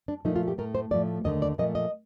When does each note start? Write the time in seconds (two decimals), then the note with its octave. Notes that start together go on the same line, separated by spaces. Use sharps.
0.08 D4
0.25 A#2 F3 A3 D#4
0.36 F4
0.48 G4
0.58 A2 A3 A#4
0.75 C5
0.91 A2 F3 A3 D5
1.24 D#2 D3 A3 D#5
1.42 D5
1.58 A#2 F3 A3 D#5
1.75 D#5